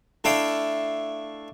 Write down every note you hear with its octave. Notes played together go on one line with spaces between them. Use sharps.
A3 D4 E4 F5 G5